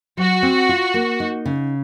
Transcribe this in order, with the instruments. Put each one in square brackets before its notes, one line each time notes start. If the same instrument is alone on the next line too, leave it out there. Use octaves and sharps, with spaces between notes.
[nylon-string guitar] F#3 [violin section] F#4
[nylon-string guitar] C4
F4
A#3
D#4
C#3